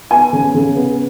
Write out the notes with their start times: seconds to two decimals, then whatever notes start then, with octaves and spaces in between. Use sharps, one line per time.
0.10 B3 G#5
0.33 C#3
0.54 C#3
0.76 B3